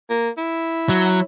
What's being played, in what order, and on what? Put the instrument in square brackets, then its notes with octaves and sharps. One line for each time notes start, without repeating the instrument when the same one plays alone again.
[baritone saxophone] A#3
E4
[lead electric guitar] F#3